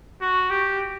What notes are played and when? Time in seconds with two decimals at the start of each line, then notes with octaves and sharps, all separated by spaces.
0.22 F#4
0.50 G4